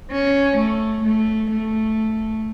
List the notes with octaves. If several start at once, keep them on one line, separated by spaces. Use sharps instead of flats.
C#4
A3
A3
A3